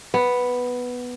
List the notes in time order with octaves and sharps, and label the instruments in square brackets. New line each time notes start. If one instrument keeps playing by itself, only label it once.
[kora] B3